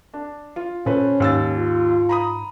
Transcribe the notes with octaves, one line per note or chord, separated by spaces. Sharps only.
D4
F4
A#2 C#4 A4 B4 C5
D#2 G#2 E6 A6
F4
A#5 B5 D#6